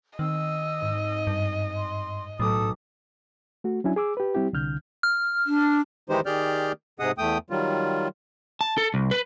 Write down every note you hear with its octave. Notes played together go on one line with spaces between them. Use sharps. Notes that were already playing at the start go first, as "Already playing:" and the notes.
D#3 C4 D#5 E6
G#2 D#7
G2
C6
B1 A2 A4 D6 D#6
A3 F#4
F#3 C#4 D4 E4 G#5
G#4 D6 E6
G4 B4
G3 C4 E4 G4
C2 D3 F6 G6
F6
D4
D#3 E3 G#3 D#4 G4 C5
D#3 G4 G#4 D5 F6 G6
G#2 C3 G#4 D#5 F#5 D#6
E2 A3 G5 D#6
D#3 F#3 G3 F4
A5
A4
C2
B4